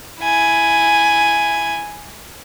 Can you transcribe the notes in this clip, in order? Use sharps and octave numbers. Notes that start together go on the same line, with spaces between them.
E4 G#5